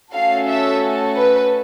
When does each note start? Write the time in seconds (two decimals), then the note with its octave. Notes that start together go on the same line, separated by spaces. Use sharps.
0.14 A3 C#4 F#4 A4 F5
0.47 E5
1.16 B4